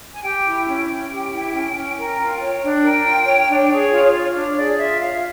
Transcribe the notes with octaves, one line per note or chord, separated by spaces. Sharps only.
G#5
G4 G5
E4
C#4 G5
C#4
G4
E4
C#4
C#4
A#4
F4
C#5
D4
A#4 G5
F4
C#5
D4
G#4 C#5
F4
C#5
D4
G#4 D5
F4 E5
C#5 F5